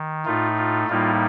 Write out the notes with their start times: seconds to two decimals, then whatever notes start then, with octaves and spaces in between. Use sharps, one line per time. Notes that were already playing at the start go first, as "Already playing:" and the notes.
Already playing: D#3
0.25 A2 A3 D#4 F4
0.58 F4
0.88 A2 G3 A#3 D#4 F4